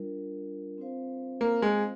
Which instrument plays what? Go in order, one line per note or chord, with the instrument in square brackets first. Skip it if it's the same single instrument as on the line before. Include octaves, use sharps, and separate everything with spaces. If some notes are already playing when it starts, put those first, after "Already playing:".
Already playing: [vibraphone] G3 D4 F4 A#4
C4 F4 C5 F5
[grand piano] A#3
G#3